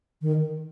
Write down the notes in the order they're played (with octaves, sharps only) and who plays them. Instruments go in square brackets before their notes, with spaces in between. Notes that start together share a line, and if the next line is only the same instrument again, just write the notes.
[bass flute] D#3